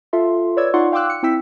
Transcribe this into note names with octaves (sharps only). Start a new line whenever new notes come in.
F4 A4 E5 C6
B4 C#5 D5 E6 G#6
D#4 F4 D5 F#5 C6 C#6
F5 G5 C6 D6 E6 F#6
C#7
C4 E4 G5 E6 B6